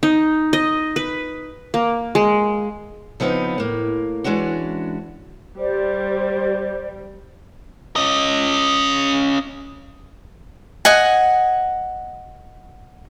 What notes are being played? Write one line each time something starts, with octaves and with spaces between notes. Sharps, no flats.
D#4
D#5
B4
A#3
G#3
C#3 F3 B3 C4 D#4
A2 A#3
E3 G#3 C#4 D4 F#4
G3 C5 D5
C#4 D#5
D#5 F#5 G#5